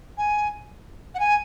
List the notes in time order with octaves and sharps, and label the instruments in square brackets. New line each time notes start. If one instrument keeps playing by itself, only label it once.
[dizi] G#5
F#5
G#5